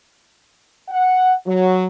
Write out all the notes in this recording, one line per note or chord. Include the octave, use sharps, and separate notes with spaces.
F#5
F#3